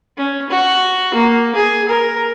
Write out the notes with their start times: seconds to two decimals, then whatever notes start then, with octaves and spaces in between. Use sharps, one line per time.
0.17 C#4
0.50 F#4
1.14 A#3
1.55 G#4
1.88 A#4